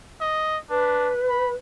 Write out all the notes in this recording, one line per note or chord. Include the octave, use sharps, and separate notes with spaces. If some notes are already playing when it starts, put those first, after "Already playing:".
D#5
D4 B4
B5